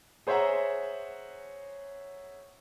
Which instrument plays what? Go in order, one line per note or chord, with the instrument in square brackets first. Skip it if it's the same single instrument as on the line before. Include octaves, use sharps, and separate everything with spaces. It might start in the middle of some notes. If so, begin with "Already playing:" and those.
[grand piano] G#4 C5 C#5 E5 F#5 A#5